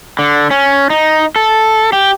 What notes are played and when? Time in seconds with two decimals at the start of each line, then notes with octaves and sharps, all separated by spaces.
0.19 D3
0.51 C#4
0.90 D#4
1.36 A4
1.93 G4